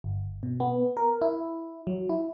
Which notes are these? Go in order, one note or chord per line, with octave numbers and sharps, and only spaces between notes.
G1
B2
B3
A#4
E4
F#3
E4